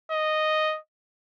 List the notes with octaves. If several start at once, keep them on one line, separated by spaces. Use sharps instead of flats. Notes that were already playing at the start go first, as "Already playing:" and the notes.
D#5